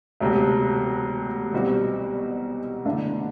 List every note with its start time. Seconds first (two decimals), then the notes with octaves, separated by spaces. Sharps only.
0.20 E1 D2 C3
1.53 C2 B2 G3 C4 F#4
2.85 F#1 E2 D3 A3 D4